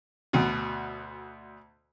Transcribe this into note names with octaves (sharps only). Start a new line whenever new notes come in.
D2 B2